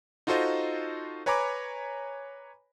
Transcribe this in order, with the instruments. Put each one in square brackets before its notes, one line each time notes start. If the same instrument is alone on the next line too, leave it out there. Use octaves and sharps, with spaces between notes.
[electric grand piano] D#4 F4 F#4 A4 C5 D#5
B4 C#5 G#5 A#5 B5 D6